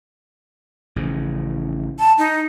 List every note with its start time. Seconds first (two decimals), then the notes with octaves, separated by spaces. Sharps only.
0.96 A1 C#3 F3
1.99 A5
2.18 D#4